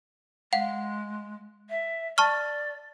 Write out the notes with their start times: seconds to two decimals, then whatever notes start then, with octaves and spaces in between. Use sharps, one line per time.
0.53 G#3 F5 F#5
1.70 E5
2.18 D5 A5 C#6 F6